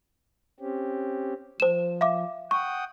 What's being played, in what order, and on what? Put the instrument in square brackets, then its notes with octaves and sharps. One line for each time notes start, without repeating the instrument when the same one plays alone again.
[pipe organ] C4 C#4 G4
[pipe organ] F3 [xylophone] C5 E7
[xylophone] E5 F5 D6
[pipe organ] F#5 G5 D#6 [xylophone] C#6